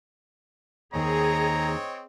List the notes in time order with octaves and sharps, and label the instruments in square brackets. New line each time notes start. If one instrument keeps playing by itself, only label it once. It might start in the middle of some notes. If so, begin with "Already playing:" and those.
[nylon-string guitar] D#2 D#3 [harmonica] C4 C#5 D#5 [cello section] G#4 [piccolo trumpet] A#5